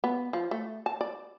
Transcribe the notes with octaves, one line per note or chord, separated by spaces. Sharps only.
B3
F3
A3
A5
D5